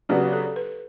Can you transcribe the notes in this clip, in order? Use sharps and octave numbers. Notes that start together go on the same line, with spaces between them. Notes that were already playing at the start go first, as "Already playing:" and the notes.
C#3 F#3 B3 D4 G4
A4
B4